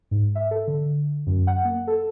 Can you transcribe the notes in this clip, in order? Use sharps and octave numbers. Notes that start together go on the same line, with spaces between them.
G#2
E5
A4
D3
F#2
F#5
A#3
A4